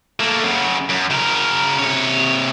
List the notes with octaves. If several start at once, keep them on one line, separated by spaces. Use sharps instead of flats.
A3 A#3
F#2 C#3
F#2
C#3 A#4
C3 C#5